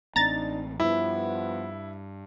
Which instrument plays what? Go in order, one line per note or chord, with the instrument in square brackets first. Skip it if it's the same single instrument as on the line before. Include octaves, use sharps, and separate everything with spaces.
[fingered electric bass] A1 C4 [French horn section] D4 D#4 [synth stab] A#5 A6
[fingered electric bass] G2 [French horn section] F3 B3 [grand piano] E4